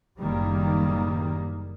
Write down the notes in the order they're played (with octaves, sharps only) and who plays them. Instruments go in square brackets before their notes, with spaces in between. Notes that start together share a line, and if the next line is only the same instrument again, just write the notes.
[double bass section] F#1 A2 D#3 G3 A#3